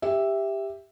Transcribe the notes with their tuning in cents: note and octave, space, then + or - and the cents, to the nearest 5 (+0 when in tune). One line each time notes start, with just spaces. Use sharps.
G4 +10 E5 +0